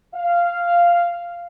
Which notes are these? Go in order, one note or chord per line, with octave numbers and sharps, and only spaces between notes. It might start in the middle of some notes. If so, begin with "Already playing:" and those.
F5